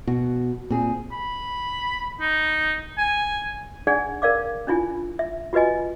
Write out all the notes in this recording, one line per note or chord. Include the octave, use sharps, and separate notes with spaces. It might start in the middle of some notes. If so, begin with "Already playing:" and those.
B2 F#4
A#2 C4 G#4
B5
D#4
G#5
D4 D#4 G#4 D5 F#5 G#5
A#4 D5 F5 D6
C#4 D4 E4 F4 G#5
E5
F4 F#4 B4 D#5 G#5